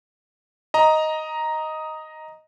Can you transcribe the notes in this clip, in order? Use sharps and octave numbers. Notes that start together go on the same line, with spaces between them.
D#5 A#5